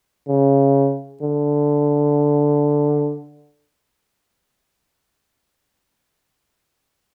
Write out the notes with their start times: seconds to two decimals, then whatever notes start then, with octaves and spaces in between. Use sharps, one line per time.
0.29 C#3
1.22 D3